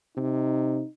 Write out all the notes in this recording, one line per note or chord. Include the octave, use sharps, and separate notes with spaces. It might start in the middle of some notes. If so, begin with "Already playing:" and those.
C3 D#4